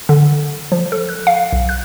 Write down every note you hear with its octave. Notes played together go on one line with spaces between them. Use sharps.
D3
F3
A4
F#6
F5
B1
F#6